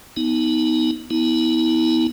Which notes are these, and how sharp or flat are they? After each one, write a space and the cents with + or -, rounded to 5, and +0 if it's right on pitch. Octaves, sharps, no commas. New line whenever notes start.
B3 +0 D#4 +25
B3 +0 E4 -40